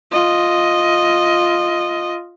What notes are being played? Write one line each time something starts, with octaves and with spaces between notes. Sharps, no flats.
F4 D#5